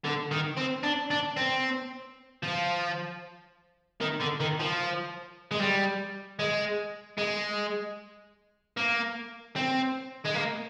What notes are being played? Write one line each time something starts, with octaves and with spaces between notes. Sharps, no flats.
D3
D#3
C4
D4
D4
C4
F3
D#3
D3
D#3
F3
G#3
G3
G#3
G#3
A#3
C4
G#3
A#3